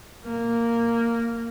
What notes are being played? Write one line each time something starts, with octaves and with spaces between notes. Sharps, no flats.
A#3